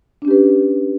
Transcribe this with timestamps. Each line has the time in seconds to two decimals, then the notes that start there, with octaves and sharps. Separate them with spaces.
0.22 D4
0.25 C#4
0.28 G4
0.31 B4